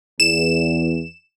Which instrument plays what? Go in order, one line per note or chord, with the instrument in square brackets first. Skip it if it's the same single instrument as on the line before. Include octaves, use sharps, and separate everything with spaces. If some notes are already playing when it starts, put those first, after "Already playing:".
[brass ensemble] E2 [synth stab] E7